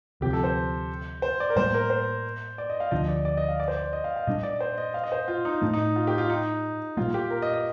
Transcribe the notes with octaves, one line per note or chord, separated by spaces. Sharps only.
D2 C3 F3 G4
A4
C5
C5
D5
A#4
A2 G3 A#3 C5
A#4
C5
D5
D#5
F5
D2 D3 F3 D#5
D5
D5
D#5
F5
D5
C5
D5
D#5
F5
F5
A#2 G3 D4 D#5
D5
C5
D#5
F5
D#5
C5
F4
D#4
A2 A3 D4
D#4
F4
G4
F4
D#4
A#2 G3 A#3 F4
G4
A#4
D#5
D#5